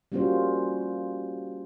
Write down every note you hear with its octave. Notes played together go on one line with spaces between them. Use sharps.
G3 A#3 C#4 F4 F#4 C5